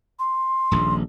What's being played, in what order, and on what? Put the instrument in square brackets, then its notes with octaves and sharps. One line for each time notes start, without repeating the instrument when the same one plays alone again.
[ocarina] C6
[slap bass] D#1 A#1